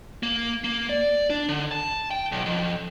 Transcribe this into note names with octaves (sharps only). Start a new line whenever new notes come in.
A#3
A#3
D5
D4
D3
A5
G5
B1
F2